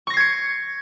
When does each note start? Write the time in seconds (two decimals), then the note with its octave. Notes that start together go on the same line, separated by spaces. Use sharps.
0.07 C#6
0.10 A#6
0.14 C7
0.17 G#6
0.20 C#7